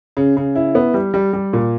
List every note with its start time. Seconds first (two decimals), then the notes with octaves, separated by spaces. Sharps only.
0.17 C#3
0.37 C#3
0.55 E4
0.75 B3
0.94 G3
1.14 G3
1.33 G3
1.53 A#2